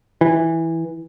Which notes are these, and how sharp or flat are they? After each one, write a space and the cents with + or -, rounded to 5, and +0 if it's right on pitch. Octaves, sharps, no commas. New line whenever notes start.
E3 -5